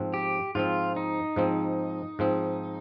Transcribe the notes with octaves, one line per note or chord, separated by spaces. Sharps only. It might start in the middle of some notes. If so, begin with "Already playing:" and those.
Already playing: G#2 F3 C4
G4
G#2 F3 C4 F4
D#4
G#2 F3 C4
G#2 F3 C4